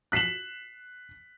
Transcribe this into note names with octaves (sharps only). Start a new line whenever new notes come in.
F#6 B6 C7 E7 F#7